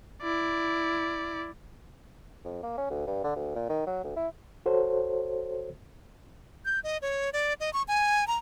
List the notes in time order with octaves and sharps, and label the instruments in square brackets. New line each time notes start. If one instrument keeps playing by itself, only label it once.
[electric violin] E4 D5
[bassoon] F2
A#3
C#4
D2
G2
D3
D2
A#2
D#3
F#3
D2
E4
[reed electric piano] F#4 A4 C5 C#5
[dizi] G6
D#5
C#5
D5
D#5
C#6
G#5
A#5